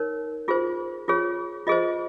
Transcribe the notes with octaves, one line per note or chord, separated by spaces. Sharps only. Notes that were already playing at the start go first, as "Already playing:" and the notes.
Already playing: D#4 A#4 C#5
F4 G#4 C5
F4 G#4 C#5
F4 G#4 C5 D#5